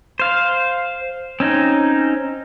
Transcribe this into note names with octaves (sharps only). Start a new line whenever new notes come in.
C5 F5
C4 C#4 D#4